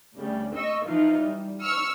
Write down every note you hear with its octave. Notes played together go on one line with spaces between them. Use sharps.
D2 C#3 G3
D#5 C#6 E6
E3 F3 D#4 F4
G3
C#6 E6 F6 C#7